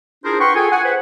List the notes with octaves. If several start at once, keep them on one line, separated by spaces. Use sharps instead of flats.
D4 E4 F4 G#4 A#4 C5
B4 F#5 G5 C6 C#6
F4 G#4 A4 G5 G#5
F#5 G#5
B4 C5 F#5